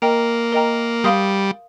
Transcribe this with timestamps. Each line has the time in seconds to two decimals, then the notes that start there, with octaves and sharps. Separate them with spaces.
0.02 A#3 A#4 D#5 G5 A#5
0.53 A#4 D#5 G5 A#5
1.04 G3 F5 C6 D#6 G6